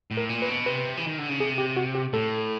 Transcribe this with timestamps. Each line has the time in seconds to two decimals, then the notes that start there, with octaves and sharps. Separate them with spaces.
0.11 A2
0.17 A#4
0.29 A#2
0.42 B4
0.48 B2
0.66 C3 B4
0.97 E3
1.07 D#3
1.18 D3
1.29 C#3
1.39 C3 G#4
1.58 G4
1.77 F#4
1.95 G4
2.13 A2 A4